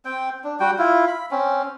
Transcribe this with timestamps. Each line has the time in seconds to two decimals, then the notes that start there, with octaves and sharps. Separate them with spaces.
0.05 C4 G5
0.44 D4
0.60 G3 F#4 G5
0.78 E4 F4
1.08 B5
1.31 C4 C#4